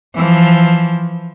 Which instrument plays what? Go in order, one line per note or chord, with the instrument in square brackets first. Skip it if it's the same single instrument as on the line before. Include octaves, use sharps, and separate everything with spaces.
[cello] E3 F3